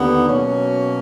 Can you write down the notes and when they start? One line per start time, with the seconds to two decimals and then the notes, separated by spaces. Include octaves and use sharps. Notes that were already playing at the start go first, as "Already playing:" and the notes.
Already playing: D#2 D3 B3
0.28 B2 F#3 A#3 C#4